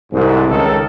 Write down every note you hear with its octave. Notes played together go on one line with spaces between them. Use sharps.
C2 G#2
C#2 D#3 A4